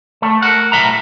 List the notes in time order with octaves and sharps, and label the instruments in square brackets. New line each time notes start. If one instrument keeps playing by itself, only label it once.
[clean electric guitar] A3
A#4 F#5
B1 A2 G#3 E5 A#5